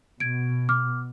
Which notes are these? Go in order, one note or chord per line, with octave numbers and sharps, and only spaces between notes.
B2 G#6 D7
D6 F6